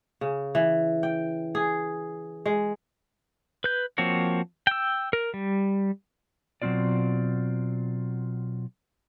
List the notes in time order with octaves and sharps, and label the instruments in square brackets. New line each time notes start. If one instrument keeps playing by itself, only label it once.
[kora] C#3
E3
G5
G#4
G#3
[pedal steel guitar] B4 G6
F3 A#3 C4 F#4 C#5
G5 E6
A#4
G3
[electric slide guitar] B2 F#3 G#3 C4 F4 D5